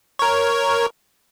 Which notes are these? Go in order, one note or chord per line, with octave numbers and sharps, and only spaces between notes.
A#4 C#5